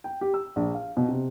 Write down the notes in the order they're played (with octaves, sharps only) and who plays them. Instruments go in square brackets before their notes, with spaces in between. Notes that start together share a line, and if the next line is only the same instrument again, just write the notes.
[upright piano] G5
G4
E6
A#1
F5
B2
C3